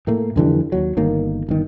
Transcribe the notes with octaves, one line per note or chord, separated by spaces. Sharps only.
A2 A3 A#3
F2 D3 E3 G3
D#2 F#3
G1 D#3 A#3
G1 D#3